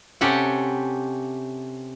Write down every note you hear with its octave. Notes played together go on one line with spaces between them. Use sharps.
C3 C#4 G4 A4 F#5